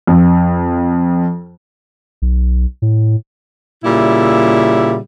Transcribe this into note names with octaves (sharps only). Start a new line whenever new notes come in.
F2
B1
A2
A#2 C#3 G3 E4 E5